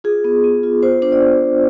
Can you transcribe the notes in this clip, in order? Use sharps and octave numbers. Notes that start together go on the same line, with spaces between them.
F4 G#4
B3
B3
F4
F4 C5
D4 C5
D5